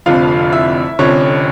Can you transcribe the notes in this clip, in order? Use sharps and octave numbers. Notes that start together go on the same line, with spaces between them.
F1 F2 D3 F3 F4 F5
E4 E5
F1 F2 D3 F3 C#4 C#5